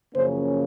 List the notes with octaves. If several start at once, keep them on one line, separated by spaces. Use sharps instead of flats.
F#2 C#3 F3 A#3 C#4 C5